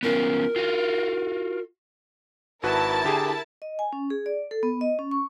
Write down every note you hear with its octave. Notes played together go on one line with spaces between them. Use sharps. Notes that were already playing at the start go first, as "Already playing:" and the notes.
B3 C#4 F4 A#4
F4 F#4 F5
G#1 E4 F#4 A#4 B4 A5
D3 G4 G#4
D#5
G#5
C#4
G#4
D5
A4
B3
D#5
C#4
C#6